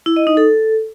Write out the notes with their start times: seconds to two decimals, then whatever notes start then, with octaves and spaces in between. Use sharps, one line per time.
0.06 E4
0.16 D#5
0.27 D#4
0.37 A4